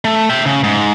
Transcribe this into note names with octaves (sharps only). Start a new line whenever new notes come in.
A3
E5 G5
C#3
G#2